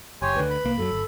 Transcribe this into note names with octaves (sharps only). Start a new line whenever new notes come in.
F#1 G4 C#5 G#5 C6
D2 D3 B4
B5
C2 A#3
F#2 F3 F#3 A4
G1